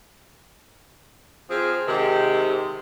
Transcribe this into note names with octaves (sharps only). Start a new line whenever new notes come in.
F3 C4 G#4
G#2 C3 D#3